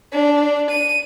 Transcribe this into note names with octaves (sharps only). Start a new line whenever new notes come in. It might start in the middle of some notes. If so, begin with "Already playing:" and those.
D4
D#7